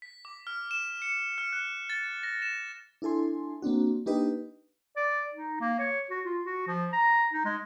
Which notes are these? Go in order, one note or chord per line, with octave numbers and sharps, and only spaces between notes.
B6
D6
F6
E7
C#7
F6
F#6
A6
A#6
E7
D4 E4 A4 G#5 C6
A#3 C4 D4 F#4
A#3 D4 D#4 G4 B4 D#5
D5
D#4
A#3
C#5
F#4
F4
F#4
F3
A#5
D#4
G#3